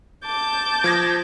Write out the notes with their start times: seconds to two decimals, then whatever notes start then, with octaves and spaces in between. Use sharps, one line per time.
0.24 A5 D6 G6
0.84 F3 G#6 A#6